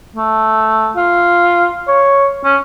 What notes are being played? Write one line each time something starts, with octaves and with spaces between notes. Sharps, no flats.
A3
F4
C#5
C#4